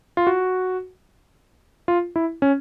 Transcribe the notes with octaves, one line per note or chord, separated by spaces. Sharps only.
F4
F#4
F4
E4
C#4